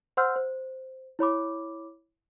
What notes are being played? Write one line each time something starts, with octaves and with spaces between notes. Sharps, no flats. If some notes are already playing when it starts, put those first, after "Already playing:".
C5 F#5 C6 E6 F6 G6
C5
E4 C#5 B5 D6